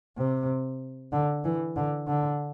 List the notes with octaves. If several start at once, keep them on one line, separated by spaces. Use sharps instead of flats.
C3
D3
E3
D3
D3